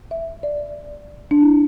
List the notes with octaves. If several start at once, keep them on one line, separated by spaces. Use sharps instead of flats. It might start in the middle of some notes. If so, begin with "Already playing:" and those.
E5
D5
D4
E4